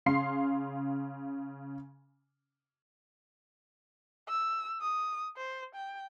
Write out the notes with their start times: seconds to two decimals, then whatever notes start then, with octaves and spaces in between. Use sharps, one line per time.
0.06 C#3 F5 C6 C7
4.28 E6
4.82 D#6
5.36 C5
5.75 G5